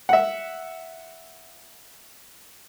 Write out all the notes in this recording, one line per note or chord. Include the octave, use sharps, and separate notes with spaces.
E5 F#5